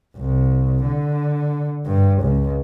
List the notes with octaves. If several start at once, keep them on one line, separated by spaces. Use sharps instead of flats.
C2
D3
G2
C#2